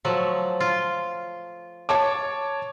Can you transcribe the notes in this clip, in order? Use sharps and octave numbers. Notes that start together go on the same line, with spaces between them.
F3 F#3 A3
F4
C#5 A5 D6